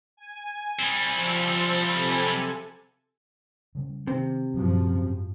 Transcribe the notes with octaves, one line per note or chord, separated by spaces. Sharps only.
G#5
G3 C4
F3
C3 A4 G#5
C#3 G3
C3 D#3
F#2 A#2 F3 F#3
G#2